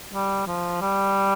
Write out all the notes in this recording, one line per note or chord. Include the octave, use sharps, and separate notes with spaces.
G3
F3
G3